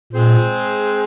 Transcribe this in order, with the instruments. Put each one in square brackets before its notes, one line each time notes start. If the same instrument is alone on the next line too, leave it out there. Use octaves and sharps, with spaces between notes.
[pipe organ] A#2 [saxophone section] G#3 C4 G#4 C5